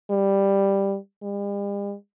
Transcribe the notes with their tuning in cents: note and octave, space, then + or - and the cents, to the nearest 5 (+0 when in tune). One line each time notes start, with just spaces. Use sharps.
G3 +5
G3 +45